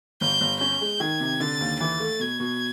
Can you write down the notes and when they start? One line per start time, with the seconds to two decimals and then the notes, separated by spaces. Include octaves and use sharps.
0.21 G1 G6
0.41 G1
0.61 C#4 G6
0.81 G#3
1.00 D#3 G#6
1.20 C3
1.40 D3 A6
1.60 D#2
1.80 E3 A6
2.00 A3
2.20 B2 G#6
2.40 B2